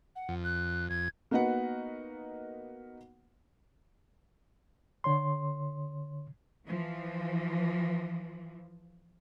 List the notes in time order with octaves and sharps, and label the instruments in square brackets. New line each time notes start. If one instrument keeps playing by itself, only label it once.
[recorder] F#5
[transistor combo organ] F2
[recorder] F#6
[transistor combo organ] F2 [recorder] G#6
[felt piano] A#3 B3 D#4 F#4 B4 F#5
[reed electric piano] D3 C#5 C6
[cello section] E3 F3